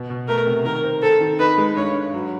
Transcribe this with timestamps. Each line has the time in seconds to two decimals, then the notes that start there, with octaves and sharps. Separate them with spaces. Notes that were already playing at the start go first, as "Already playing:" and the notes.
Already playing: B2
0.10 B2
0.28 A3 A#4
0.47 C3
0.65 D#3 A#4
0.84 C4
1.02 C4 A4
1.20 D#3
1.39 D#4 B4
1.58 G#3
1.76 G2 C#5
1.95 G2
2.14 F#3